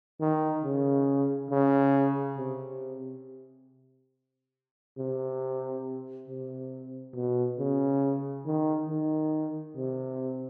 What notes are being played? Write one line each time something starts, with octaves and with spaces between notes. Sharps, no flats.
D#3
C#3
C#3
C3
C3
C3
B2
C#3
D#3
D#3
C3